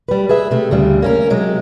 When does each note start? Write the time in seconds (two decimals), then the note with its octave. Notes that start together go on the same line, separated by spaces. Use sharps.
0.08 G3 B4
0.29 G#4 B4 E5
0.51 C3 A3
0.71 D2 C#3 G3
1.02 A#3 C#4 A#4
1.30 C3 F#3 G#3